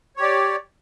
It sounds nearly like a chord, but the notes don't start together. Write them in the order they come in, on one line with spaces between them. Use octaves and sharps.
C#5 G4 D5